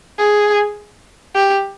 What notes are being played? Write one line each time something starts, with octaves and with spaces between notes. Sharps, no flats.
G#4
G4